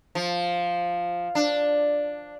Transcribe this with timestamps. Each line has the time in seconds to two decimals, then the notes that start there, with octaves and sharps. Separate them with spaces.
0.15 F3
1.35 D4